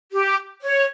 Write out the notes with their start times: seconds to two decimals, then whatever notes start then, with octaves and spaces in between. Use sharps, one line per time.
0.12 G4
0.62 C#5